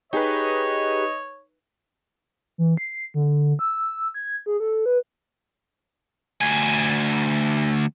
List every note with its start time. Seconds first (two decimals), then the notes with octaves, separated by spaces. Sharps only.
0.13 D#4 G4 G#4 B4 C#5 D#5
2.58 E3
2.77 C7
3.14 D3
3.59 E6
4.14 G#6
4.46 G#4
4.60 A4
4.86 B4
6.41 D2 G#5